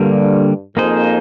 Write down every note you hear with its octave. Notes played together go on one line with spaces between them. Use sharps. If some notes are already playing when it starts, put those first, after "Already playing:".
Already playing: G2 D3 G3 A#3
F2 A#3 D#4 G#4 C5